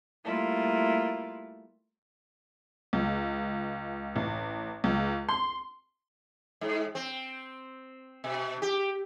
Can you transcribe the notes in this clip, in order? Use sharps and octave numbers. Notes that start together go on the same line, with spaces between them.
G3 A3 A#3 E4 F4
C#2
A1
C#2
C6
G#2
C4
B2
G4